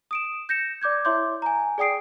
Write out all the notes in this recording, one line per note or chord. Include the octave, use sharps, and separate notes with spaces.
D#6 D7 E7
G6 A#6 C#7 E7
D5 D6 G6 G#6
E4 C#5 E5 C6 D6 G6
G#5 A#5
G#4 D5 G5 D#6 C7 D7